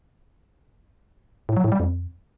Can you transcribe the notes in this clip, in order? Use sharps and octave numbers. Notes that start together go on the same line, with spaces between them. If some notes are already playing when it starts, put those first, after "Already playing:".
A2
F#3
A2
G3
F2